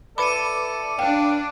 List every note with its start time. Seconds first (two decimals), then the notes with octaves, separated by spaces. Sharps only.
0.18 E4 A4 B4 D5 B5 D6 C#7 D#7
0.99 D4 B4 F5 G5